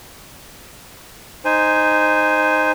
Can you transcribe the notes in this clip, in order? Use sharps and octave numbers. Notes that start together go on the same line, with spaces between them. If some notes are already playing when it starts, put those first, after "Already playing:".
D#4 C5 G#5